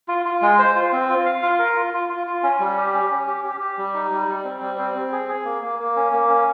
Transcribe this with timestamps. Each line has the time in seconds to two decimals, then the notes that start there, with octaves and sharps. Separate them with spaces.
0.08 F4
0.25 F4
0.42 G#3
0.59 C5
0.76 F4
0.92 C4
1.09 F4
1.26 F5
1.43 F4
1.59 A#4
1.76 F4
1.94 F4
2.09 F4
2.27 F4
2.43 C#4
2.60 G3
2.77 G4
2.94 C#4
3.11 C#4
3.27 G4
3.44 G4
3.60 G4
3.78 G3
3.94 D#4
4.11 G3
4.28 G3
4.44 C4
4.61 G3
4.78 C4
4.95 C4
5.13 G#4
5.29 G#4
5.45 A#3
5.62 A#3
5.79 A#3
5.96 C#4
6.13 A#3
6.29 C#4